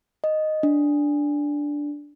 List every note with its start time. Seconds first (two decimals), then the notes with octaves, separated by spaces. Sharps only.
0.24 D#5
0.63 D4